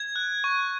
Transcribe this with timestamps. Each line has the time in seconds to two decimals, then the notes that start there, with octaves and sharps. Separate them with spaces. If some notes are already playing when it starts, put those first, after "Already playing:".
Already playing: G#6
0.16 F#6
0.44 C#6